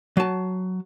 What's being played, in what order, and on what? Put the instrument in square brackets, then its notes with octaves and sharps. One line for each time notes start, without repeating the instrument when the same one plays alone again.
[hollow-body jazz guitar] F#3 A5